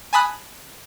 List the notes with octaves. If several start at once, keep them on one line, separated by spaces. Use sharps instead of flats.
G#5 A5 B5 D#6 F#6